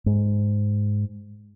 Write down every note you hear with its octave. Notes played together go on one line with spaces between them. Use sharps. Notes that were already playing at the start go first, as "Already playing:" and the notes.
G#2